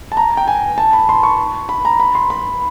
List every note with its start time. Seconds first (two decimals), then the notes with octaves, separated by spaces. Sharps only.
0.12 A5
0.17 A#5
0.37 G5
0.48 G#5
0.78 A5
0.93 B5
1.09 C6
1.23 C#6
1.69 B5
1.85 A#5
2.00 B5
2.15 C6
2.30 B5